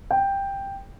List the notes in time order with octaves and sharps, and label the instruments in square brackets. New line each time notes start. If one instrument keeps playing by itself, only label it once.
[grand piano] G5